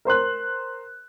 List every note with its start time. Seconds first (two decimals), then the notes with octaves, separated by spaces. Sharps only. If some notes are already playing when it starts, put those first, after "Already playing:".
0.05 A#4 C5 C6 F#6